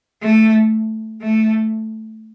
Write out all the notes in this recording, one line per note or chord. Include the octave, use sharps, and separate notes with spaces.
A3
A3